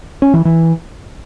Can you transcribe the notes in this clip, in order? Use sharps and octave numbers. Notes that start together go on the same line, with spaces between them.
C#4
E3
E3